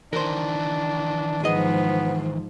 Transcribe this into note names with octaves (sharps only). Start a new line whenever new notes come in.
D#3 E3 D4 A#4 C5
G#2 F3 B3 G#4 D#5